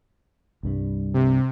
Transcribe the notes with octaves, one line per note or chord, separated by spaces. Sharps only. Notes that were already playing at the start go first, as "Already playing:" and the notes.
C2 G2 G3
C3